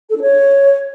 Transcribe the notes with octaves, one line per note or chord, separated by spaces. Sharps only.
A4
D4
C#5